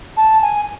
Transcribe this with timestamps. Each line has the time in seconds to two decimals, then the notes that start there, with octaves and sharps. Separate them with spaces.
0.16 A5
0.41 G#5